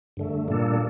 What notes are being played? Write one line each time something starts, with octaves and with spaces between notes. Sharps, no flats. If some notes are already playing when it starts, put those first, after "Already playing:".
G2 D3 A3
A#2 G3 A#3 D4 A4